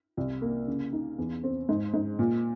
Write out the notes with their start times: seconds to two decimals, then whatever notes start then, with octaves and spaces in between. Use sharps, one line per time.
0.17 C2
0.41 A#3
0.67 C#3
0.93 D#4
1.18 E2
1.43 C4
1.69 G#2
1.94 G#2
2.19 A#2